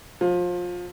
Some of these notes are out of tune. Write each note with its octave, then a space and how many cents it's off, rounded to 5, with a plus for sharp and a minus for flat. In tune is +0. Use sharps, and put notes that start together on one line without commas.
F3 +25